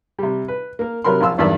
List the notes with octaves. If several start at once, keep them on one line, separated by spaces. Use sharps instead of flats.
C3 G3
B4
A#3 A#4
C3 F#3 A#4 B5 C6
A#1 F4 C6 E6
B1 E2 G2 D#3 D5 E5